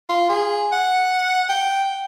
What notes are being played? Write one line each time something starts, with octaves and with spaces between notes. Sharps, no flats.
F4
G#4
F#5
G5